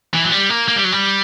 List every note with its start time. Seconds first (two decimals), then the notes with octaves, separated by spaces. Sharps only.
0.14 E3
0.24 F#3
0.32 G3
0.50 A#3
0.68 A#3
0.76 G3
0.84 F#3
0.92 G3